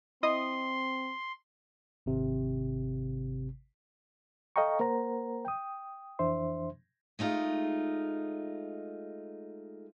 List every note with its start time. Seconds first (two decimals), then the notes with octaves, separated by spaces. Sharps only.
0.23 C4 E4 D#5 C6 D#6
2.06 G#1 C3
4.56 A4 D#5 F5 G5 A#5 C#6
4.80 A#3 A#4 C5 F#5 A#5
5.45 G5 D#6
6.19 F2 E3 D4 C5 E5 C6
7.19 G#3 A3 D#4 F4